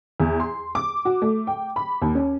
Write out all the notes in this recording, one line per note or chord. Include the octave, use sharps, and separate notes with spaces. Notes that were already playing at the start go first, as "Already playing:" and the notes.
E2
C6
D6
F#4
A3
G5
B5
D#2
C#4